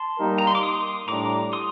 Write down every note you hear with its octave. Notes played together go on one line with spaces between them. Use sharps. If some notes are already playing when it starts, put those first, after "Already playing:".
Already playing: A5 C6
G3 A#3 D#4 G4 A#4
A#5
C6
D6
C6 D#6
A2 G3 D4 A#5 D6
C6 D#6